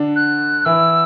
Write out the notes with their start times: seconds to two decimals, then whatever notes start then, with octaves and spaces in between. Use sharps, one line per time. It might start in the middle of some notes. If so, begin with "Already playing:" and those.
Already playing: D3 D4
0.16 F#6
0.65 E3 E4 E6